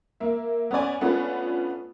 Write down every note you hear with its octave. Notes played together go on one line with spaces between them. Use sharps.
A#3 E5
B3 C#4 C#5 D5 G#5
A3 B3 C#4 D4 F4 B4